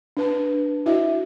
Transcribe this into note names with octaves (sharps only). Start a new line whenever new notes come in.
D4 B4 A5
E4 F#4 D#5 E5